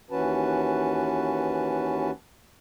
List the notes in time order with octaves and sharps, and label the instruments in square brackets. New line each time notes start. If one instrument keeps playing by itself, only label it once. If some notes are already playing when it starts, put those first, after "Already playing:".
[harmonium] D#2 E3 C#4 F#4 B4 A5